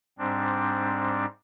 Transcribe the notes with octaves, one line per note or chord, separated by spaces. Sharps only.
G#2 G3 C4 D4